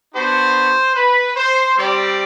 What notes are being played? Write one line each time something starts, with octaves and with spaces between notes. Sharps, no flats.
B3 D4 F#4 C5
B4
C5
G3 C4 G4 D5